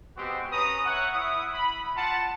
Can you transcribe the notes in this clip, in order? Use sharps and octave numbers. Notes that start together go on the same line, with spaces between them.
G#3 B3 C4 F#4 G4
C#4 B4 A#5 D#6
C#5 E5 F#5
E4 D#6
B5
F4 F#5 A5